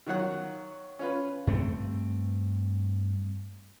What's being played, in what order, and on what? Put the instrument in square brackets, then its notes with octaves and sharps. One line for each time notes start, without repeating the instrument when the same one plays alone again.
[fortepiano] D#3 F#3 F4 F#5 F#6
C#4 F4 B4
[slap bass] G2 A3 C4